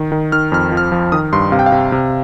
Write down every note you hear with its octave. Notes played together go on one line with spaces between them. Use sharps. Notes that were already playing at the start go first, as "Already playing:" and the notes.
Already playing: D#3
D#3
D#3 F6
F2 F6
F3
F6
F3
D#3 D#6
G2 C6
C3 F5
G5
F5
C3
C3